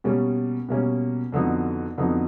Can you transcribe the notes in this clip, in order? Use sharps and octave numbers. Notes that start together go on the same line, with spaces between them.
B2 G3 A#3 C#4
B2 G3 A#3 C#4
F2 D3 F#3 B3 D#4
F2 D3 F#3 B3 D#4